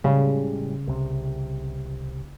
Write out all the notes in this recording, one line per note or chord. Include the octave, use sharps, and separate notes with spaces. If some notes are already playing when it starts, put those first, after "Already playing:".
A2 C#3 G3 G#3
C2 C3